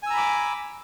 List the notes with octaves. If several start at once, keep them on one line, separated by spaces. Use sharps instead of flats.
G#5 A#5 B5 D6 E6